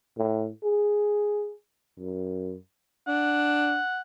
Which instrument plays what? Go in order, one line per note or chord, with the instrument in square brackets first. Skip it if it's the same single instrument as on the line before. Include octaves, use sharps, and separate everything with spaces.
[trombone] A2
G#4
F#2
[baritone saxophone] D4 [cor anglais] F#5